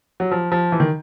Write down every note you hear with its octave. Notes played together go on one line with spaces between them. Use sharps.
F#3
F3
F3
E3
D#3